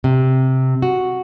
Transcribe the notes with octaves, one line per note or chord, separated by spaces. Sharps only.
C3
F#4